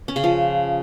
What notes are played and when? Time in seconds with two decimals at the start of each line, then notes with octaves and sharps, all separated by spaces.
0.08 C#4
0.16 C#3
0.24 F3